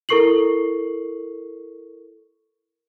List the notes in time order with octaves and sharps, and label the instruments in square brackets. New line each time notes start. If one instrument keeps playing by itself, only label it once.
[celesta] E4 A4 A#4 C#6 C7 F#7